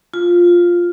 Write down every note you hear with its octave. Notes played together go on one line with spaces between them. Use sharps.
F4